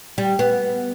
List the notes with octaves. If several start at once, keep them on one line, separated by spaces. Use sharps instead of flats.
G3
B3